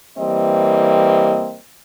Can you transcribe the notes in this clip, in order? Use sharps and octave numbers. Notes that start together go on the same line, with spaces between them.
E3 G3 A#3 C4 D#5